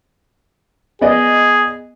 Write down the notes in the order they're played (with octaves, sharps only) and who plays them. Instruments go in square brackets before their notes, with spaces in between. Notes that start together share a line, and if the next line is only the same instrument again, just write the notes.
[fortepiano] B3 D5 D#5 [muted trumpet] G#4